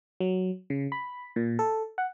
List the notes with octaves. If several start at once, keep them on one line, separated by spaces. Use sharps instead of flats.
F#3
C#3
B5
A#2
A4
F#5